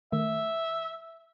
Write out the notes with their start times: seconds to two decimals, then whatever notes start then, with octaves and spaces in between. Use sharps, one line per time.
0.12 D#3 A3 E5